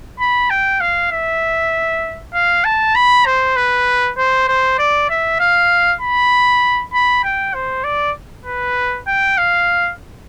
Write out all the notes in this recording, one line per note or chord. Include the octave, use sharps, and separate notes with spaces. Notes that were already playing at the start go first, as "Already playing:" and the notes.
B5
G5
F5
E5
F5
A5
B5
C5
B4
C5
C5
D5
E5
F5
B5
B5
G5
C5
D5
B4
G5
F5